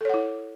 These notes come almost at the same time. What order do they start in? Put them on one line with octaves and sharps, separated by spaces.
A4 C#5 F#5 E4